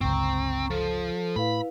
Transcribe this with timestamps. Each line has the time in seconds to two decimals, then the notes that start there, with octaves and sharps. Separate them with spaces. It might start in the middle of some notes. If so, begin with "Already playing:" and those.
0.01 G1 C#2 C4 A#5 C#6
0.70 F3 A4
1.36 A2 E4 B4 F5 B5